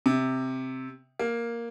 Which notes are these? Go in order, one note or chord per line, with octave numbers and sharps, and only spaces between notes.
C3
A#3